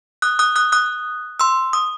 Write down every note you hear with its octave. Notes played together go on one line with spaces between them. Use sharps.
D#6 F#6
D#6 F#6
D#6 F#6
D#6 F#6
C6 E6
D#6